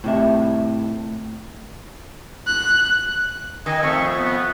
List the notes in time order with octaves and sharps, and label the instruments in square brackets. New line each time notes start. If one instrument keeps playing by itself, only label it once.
[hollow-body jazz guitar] A2 C3 E5
[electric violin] F#6
[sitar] D#3 [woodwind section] D#5 G#5
[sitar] F2 A3 [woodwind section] E5 F5 C#6
[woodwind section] B3